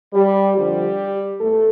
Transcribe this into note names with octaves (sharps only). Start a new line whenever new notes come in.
G3 G4
F2 D3 F3 G3 G4
E2 A3 A4